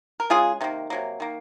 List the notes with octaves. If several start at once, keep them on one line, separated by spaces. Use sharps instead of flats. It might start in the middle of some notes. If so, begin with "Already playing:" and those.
A#4
C#3 G#3 F4 G#4
C3 D#3 A#3
C3 F#3 A#3
D#3 A#3